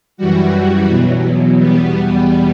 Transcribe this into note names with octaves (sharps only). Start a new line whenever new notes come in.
F#2 E3 G3 F#4
E2 B2 F#3
E2 B2 G3 B3
B3